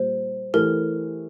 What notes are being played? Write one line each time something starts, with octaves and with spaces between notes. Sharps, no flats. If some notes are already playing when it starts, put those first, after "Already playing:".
Already playing: A#2 G3 C5
E3 A3 E4 G4 A#4